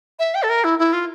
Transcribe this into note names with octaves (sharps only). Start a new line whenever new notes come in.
E5
G5
A4
A#4
E4
E4
F4